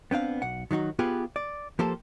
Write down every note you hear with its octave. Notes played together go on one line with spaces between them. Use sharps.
B3 C4 D4 F5
B1 F#5
D#3 F#3 D#4 F#4
B3 F4 G4 G#4 B4
D5
F3 A#3 G4 A4 C5